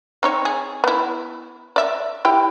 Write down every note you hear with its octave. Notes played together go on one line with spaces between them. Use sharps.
C4 D#4 C#5
G#4
B3 E4
D5 E5
E4 G4 G5